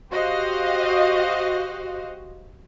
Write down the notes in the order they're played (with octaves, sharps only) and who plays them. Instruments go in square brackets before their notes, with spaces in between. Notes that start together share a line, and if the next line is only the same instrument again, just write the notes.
[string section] F#4 G4 C5 D#5 F5